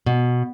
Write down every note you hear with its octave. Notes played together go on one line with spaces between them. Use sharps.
B2